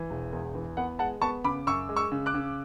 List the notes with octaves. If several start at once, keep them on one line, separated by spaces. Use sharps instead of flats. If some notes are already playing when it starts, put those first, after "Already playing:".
Already playing: E3
E1
E2
E3
B3 F#5
G#3 F#5 A5
B3 A5 C#6
C#3 B5 D6
F#2 C#6 E6
G#3
C#6 E6
C#3
D6 F#6
C#3